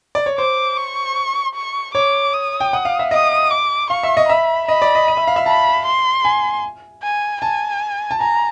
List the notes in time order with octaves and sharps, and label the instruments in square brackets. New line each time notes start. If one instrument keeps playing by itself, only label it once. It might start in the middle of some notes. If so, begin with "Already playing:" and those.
[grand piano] D5
C#5
[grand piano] C5 [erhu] D6
[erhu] C#6
C#6
[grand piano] C#5 [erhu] D6
[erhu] D#6
[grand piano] G5
F#5
F5
E5
[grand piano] D#5 [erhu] D#6
[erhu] D6
[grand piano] F5 [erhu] C#6
[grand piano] E5
D#5
[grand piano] E5 [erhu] B5
[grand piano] D#5 [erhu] B5
[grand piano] D5
D#5
D#5
E5
F5
E5
[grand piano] A5 [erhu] B5
[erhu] C6
[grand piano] G#5
[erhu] G#5
[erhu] G#5 [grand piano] A5
[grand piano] A5
[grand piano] G#5 [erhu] A#5